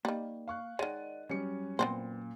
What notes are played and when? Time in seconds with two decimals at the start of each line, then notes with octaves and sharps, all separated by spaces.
0.05 D#3 G3 A#3
0.48 F5 C#6 F#6
0.79 D#3 G#3 C#5 D5 F#5 D#7
1.29 F#2 G3 C#4 C#7
1.79 A#2 B3 C4 C5